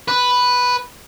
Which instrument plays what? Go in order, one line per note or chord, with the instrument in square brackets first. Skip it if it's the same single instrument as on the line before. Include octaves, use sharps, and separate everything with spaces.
[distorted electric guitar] B4